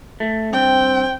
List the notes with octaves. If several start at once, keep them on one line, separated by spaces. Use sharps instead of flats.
A3
G2 C4 G5